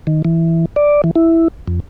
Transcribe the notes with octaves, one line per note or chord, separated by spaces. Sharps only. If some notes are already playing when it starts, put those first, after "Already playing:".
D#3
E3
D5
E3
E4
F2